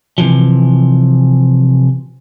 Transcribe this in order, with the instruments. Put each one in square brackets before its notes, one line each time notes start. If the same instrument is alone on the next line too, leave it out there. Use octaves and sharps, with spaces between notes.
[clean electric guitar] C3 E3 F3